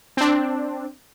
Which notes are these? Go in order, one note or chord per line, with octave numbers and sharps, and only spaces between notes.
C4 D4